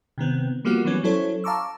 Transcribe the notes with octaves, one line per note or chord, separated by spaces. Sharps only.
C3 D#3 B3 C4
F3 G3 A#3 B3 F4 F#4
E3 F#3 G3 B3 C#4
F#3 C#4 E4 A4 C5 C#5
F5 A5 A#5 C#6 D6 E6